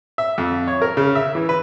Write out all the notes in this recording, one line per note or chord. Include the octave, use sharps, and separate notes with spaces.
E5
F2
C#5
A#4
C#3
E5
E3
B4